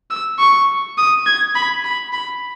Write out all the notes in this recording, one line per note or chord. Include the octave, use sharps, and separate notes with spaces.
E6
C#6
D#6
G#6
B5
B5
B5